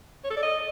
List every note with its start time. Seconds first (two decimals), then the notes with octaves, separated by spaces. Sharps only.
0.24 C#5
0.30 A4
0.36 D5
0.43 D#5